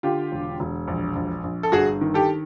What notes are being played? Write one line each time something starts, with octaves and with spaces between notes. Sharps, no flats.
D3 F4 G4
E1
E1
A#1
A#1
A#1
A4
G1 F#4 G#4
D#3
G4 A4